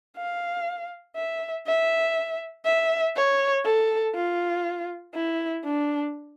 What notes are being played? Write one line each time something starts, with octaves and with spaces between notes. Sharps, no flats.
F5
E5
E5
E5
C#5
A4
F4
E4
D4